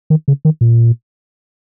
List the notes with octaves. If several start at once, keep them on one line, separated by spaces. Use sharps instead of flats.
D#3
C#3
D#3
A#2